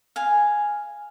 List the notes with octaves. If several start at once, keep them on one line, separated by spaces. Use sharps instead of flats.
F5 G#5